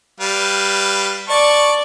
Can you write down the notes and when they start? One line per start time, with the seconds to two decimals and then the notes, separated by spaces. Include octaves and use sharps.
0.20 G3 B4 F5
1.29 D5 A5 C#6